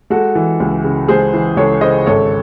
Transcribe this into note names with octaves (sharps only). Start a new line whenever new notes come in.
G#3 F#4 A4
E3
C#2
C#3
G#3 G#4 C5
E3
C#2 A4 C#5
C#3 C5 D#5
G#1 A4 C#5